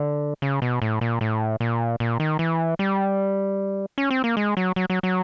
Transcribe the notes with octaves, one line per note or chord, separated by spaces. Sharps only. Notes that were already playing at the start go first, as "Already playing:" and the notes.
Already playing: D3
C#3
B2
A2
A#2
A2
A#2
A#2
D#3
E3
G3
C#4
C4
A#3
G#3
F#3
F#3
F#3
F#3